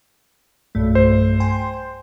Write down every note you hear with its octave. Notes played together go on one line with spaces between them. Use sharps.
B1 G2 A3
C5
G5 G#5 C6